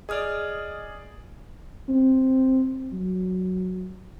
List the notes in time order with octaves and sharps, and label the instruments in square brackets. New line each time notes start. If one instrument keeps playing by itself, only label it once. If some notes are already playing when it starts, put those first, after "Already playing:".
[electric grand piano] G#4 D5 [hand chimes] D#5 D#6 F6
[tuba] C4
F#3